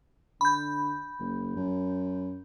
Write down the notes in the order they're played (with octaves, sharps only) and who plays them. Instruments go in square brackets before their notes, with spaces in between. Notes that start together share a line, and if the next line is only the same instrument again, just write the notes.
[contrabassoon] D3 [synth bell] B5 G6
[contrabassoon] F#1
F#2